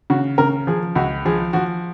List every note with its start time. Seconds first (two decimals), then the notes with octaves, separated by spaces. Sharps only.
0.10 C#3 F#4
0.38 C#3 A#4
0.67 F3 G#4
0.96 C#2 F#4
1.26 F3 G#4
1.53 F3 F#4